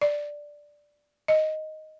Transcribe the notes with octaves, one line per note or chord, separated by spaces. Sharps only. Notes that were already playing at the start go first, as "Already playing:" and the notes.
D5
D#5